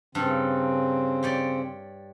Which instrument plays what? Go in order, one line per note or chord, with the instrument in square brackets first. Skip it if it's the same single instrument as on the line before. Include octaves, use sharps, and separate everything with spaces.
[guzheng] G2 A4 [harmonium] C#3 C4
[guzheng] G4 C#5 D5